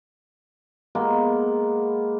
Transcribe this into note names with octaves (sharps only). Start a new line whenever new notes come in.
G#3 A#3 B3